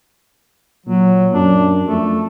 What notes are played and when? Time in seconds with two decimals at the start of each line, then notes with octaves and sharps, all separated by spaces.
0.87 A#2 F#3
1.34 F#2 D4
1.87 F2 A3